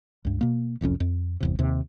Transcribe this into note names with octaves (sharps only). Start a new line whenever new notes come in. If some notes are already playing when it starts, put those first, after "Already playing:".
C#2 G2
B2 A#3
F#1 C2 F2 C#4
F2
G1 E2 C3
D#2 C3